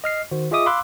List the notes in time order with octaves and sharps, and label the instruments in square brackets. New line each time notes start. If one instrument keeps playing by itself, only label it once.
[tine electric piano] D#5 F6 C7
D#3 F#4 C5
F4 G#4 D#5 E5 D6 D#6
F5 B5 C6 D6 E6 F#6